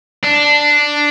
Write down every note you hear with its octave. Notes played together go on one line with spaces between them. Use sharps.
D4